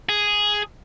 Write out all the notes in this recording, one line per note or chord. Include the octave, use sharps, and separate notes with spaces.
G#4